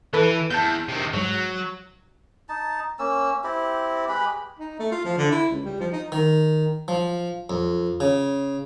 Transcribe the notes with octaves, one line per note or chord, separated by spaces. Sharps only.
E3 A4 B4
E2 A5 G6
C3 D#3
G#2 F#3
D#4 A5
A#3 C#4 E6
C4 E4 G4
G#3 G4 B4 B5
D#4
A3
F4
F3
D3
E4
C#2
G3
F3
D#4
D#3
F3
F2
C#3